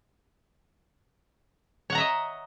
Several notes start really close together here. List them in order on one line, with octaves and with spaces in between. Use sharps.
C#5 F#5 A#5 E5 D#5